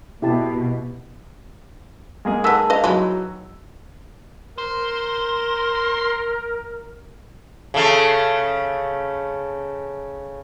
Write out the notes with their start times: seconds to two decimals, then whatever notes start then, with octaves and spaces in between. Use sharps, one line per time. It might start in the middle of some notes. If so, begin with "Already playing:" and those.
0.22 B2 E4 G4 A5
2.25 G#3 A#3 G#4
2.44 D#3 B3 A5 E6 B6
2.70 B4 D#5 F5
2.84 E3 F#3 G#3 D#4 E4
4.58 A#4 C5
7.74 C#3 A3